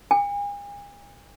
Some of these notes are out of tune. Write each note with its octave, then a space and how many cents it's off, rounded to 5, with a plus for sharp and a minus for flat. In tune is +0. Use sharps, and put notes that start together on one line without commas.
G#5 -40